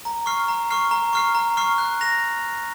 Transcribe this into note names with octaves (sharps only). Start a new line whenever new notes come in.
A#5
C#6 F6 C7
A#5
C#6 F6 C7
A#5
C#6 F6 C7
A#5
C#6 F6 C7
F#6
A#6 F7